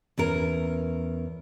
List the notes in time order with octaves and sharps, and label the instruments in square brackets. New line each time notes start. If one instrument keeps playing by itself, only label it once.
[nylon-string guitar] E2 C#4 A#4